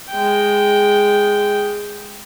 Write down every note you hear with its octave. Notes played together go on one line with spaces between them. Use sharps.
G#3 G5